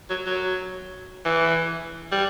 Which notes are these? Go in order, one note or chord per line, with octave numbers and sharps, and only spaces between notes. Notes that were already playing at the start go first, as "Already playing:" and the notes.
F#3
F#3
E3
G3